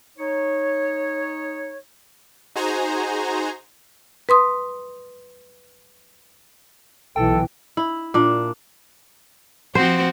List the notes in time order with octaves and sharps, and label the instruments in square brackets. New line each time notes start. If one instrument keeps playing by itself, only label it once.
[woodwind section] D#4 C#5
[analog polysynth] D#4 F#4 G#4 C5 G#5 A#5
[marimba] B4 C6 D#6
[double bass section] B1 E3 [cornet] A4 [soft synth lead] G5
[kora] E4
A#2 D4
[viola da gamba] F3 C4 F#4 [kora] C5